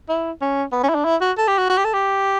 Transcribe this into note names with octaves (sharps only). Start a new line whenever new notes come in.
E4
C#4
B3
C#4
E4
D4
E4
F#4
A4
G4
F#4
F#4
G4
A4
G4